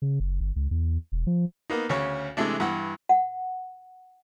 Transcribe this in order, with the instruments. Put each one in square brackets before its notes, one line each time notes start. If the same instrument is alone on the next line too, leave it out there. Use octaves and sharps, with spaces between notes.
[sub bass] C#3
F#1
G1
C#2
E2
E1
F3
[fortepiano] A#3 B3 D#4
D2 C#3 C#4 C#5
C3 E3 G#3 A3 D4
G2 E3 F#5 E6 F#6
[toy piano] F#5